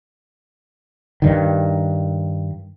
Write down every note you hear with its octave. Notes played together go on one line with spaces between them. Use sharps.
G2 D#3